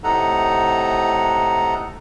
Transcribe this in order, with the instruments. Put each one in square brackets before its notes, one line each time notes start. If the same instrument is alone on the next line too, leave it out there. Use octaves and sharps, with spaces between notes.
[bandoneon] A2 C3 D#4 A4 F#5 A#5